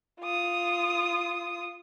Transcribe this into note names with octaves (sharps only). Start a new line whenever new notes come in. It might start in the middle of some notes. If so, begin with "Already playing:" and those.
F4 D#6